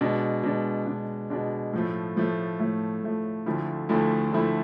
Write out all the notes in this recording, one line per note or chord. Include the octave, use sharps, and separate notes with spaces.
B2 G#3 D4
B2 G#3 D4
B2 G#3 D4
B2 G#3 D4
A2 F3 A3
A2 F3 A3
A2 F3 A3
A2 F3 A3
D2 D3 F3 A3 E4
D2 D3 F3 A3 E4
D2 D3 F3 A3 E4